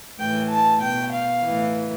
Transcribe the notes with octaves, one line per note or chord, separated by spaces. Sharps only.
A2 E3 G5
A5
B2 G5
F5
A2 E3